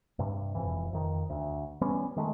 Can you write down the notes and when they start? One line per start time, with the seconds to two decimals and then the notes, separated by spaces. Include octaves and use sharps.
0.19 G2 C3
0.55 E1 F2 E3
0.93 F2 D#3
1.30 D2
1.81 E3 G3 B3 C#4
2.17 D#3 G#3 A3